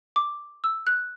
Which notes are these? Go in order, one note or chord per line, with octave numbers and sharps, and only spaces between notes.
D6
E6
F#6